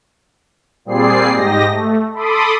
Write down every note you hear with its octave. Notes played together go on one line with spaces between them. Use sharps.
A#2 G3 C4 G#4 D5 C7
G#2 G4 D#5 A#6
A3
A4 B5 C6 D6 D#6